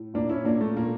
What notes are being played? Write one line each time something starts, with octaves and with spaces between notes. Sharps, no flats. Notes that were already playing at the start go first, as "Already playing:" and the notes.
Already playing: A2
A#2 A#3 D4
C#4 E4
A#2 A#3 D4
A3
A#2 A#3